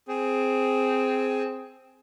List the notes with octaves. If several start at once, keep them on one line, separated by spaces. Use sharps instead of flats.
C4 G#4